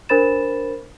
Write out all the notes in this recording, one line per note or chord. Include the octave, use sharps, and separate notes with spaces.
D4 A#4 C5 B5 A6 E7